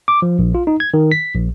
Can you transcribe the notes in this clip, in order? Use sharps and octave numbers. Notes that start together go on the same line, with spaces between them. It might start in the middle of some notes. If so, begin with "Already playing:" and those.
D6
F3
A#1
F4
D#4
G#6
D#3
B6
A#1